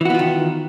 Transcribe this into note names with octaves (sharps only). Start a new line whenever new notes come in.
D#3 E3 B3 F4 F#4